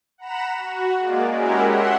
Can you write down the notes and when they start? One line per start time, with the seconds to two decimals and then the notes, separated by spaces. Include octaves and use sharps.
0.18 F#5 A#5 B5 E7
0.54 F#4
0.99 G#3 A#3 D5
1.31 G#3 C#4 E4 F#4 G4 A#4
1.65 E5 F#5 C6